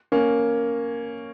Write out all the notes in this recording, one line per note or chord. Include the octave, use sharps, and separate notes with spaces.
A#3 C#4